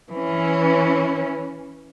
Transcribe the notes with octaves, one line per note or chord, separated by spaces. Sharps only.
E3 C#4